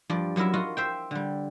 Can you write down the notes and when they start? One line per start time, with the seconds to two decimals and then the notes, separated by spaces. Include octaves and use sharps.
0.10 G2 F3 D5
0.36 F#2 F#3 E4 A#4 E5
0.54 F4 F#4 D#5 F#5
0.77 C5 E5 G5
1.11 D3 G3